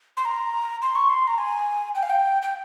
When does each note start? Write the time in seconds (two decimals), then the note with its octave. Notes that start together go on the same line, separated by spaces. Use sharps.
0.17 C6
0.25 A#5
0.82 C6
0.95 C#6
1.10 C6
1.27 A#5
1.38 G#5
1.95 G5
2.03 F5
2.10 G5
2.42 G5